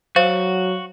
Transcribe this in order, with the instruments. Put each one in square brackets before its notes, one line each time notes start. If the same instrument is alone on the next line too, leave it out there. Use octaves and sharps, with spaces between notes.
[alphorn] F#3 [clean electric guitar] F#4 [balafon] C5 [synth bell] F5